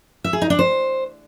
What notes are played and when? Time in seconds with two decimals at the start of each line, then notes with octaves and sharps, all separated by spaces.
0.24 E5
0.33 G#4
0.42 D#4
0.50 D4
0.59 C5